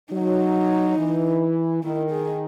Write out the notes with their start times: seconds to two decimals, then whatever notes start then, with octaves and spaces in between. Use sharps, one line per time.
0.13 F#3 D#4
0.98 E3
1.83 D#3 E4
2.11 G#4